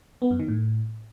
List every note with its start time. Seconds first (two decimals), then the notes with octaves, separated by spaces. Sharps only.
0.22 B3
0.31 F#2
0.39 D#3
0.48 A2